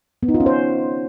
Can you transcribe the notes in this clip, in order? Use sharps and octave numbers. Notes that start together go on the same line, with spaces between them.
B3
D#4
F4
C#4
C5